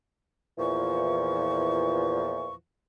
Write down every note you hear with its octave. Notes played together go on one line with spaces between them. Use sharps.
E2 A#2 E3 F3 C#6